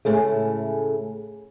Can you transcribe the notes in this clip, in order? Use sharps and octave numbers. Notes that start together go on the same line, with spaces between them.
A2 C#3 G#3 A3